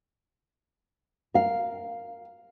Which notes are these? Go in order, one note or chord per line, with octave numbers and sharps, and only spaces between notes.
A#4 F5